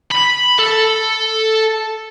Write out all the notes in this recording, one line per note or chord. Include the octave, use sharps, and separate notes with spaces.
B5
A4